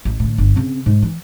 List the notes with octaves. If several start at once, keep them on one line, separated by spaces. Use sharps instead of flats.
A1
A2 D3
G1
C#3 C4
G#2
E3